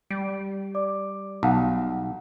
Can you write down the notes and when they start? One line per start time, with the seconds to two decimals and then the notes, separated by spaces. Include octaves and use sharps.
0.11 G3 D7
0.75 D5 D6
1.43 B1 F5 F#5 A5